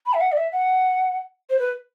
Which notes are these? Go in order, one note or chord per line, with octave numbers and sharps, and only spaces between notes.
B5
E5
F#5
D5
E5
F#5
C5
B4